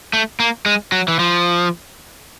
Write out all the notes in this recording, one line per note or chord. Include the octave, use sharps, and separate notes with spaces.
A3
A#3
G#3
F#3
E3
F3